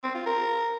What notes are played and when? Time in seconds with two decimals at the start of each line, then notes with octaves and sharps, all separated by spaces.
0.04 C4
0.15 F4
0.26 A#4